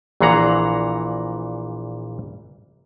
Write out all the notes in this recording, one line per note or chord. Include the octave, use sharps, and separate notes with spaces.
A#1 A#2 E3 G#4 F#5 A#5